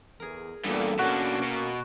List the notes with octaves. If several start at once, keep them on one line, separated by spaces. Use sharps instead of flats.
E2 G#4 A#4
E2 G2 A#2 B3 A4 G5
B2 A#3 C#4 D4 F#4
B2